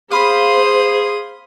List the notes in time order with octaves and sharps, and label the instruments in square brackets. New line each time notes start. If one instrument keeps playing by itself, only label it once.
[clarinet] G#4 [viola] C5 [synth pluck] F5 B5 [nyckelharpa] C6 D#6